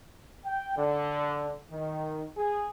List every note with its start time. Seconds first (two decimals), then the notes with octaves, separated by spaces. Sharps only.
0.45 G5
0.76 D3
1.71 D#3
2.37 G#4